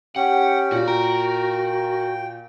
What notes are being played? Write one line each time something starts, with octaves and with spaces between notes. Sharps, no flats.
C#4 G4 F#5 G5
A#2 F#4
A#4 G5